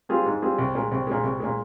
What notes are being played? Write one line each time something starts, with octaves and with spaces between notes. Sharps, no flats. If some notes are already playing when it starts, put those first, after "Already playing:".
G3 C4 F4 G#4
G#2
G3 C4 F4 G#4
C2
A#2 G#3
C2
A#2 G#3
C2
A#2 G#3